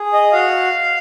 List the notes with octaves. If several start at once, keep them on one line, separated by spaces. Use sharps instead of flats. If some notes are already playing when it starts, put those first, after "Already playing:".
Already playing: G#4
D#5
F#4 F5